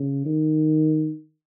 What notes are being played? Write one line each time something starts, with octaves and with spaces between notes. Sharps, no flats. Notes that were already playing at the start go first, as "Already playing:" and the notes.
Already playing: C#3
D#3